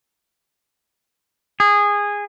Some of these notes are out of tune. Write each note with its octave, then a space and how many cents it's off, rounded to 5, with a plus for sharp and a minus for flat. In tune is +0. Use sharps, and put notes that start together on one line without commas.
G#4 -15